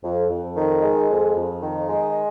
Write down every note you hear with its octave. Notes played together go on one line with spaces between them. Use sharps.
F2
F2
D#3
G#3
F2
F2
D#3
G#3